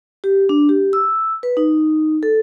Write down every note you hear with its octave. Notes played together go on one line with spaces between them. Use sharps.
G4
D4
G4
E6
B4
D#4
A4